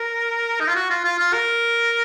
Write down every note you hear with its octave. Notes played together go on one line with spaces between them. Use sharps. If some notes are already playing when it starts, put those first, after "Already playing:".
Already playing: A#4
D#4
F4
F#4
F4
F4
F4
A#4